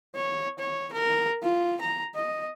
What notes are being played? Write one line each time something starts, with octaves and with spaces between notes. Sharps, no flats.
C#5
C#5
A#4
F4
A#5
D#5